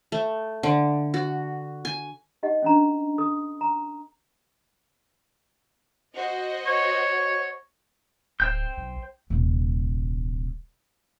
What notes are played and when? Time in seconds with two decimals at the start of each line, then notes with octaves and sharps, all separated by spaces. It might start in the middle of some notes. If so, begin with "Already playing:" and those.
0.12 A3
0.63 D3
1.14 F#4
1.85 G#5
2.43 D#4 G4 D#5 F#5
2.62 C#4 D4 A#5
3.18 A4 D#6
3.61 A#5
6.16 F#4 C5 D#5
6.66 C#5
8.40 D1 C5 G5 G6
8.77 B1
9.30 D#1 C2